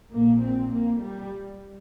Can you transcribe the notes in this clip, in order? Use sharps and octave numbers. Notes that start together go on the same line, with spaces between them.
A#1 A#2 A#3
C4
A#3
G3